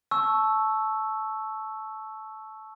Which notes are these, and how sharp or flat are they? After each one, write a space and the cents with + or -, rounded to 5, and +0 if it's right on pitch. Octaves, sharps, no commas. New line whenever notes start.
A5 -15 C#6 +0 E6 +0